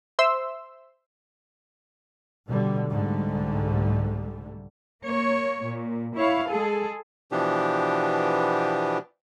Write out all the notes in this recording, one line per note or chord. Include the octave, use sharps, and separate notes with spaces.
C5 E5 C6 E6
B2 D3 G3
C2 G#2 D3 G3 A3
A#3 C#5
A#2
E4 C#5 F5
G#3 G#4 A4
B2 E3 F3 B3 D4 G4